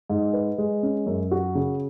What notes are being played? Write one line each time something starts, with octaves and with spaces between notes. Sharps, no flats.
G#2
B4
G#3
C#4
F#2
F#4
C#3